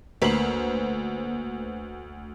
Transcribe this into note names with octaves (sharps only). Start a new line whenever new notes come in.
D2 A#3 B4 C5 F#7